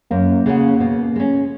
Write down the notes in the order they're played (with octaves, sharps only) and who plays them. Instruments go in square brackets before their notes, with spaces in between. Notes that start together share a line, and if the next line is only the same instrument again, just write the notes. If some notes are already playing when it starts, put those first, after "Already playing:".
[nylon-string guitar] F#2 [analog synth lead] A#3
[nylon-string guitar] C#3 G#3 C#4 F#4
B2
G#3 C#4